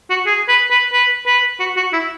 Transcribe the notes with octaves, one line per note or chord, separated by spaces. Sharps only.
F#4
G#4
B4
B4
B4
B4
F#4
F#4
E4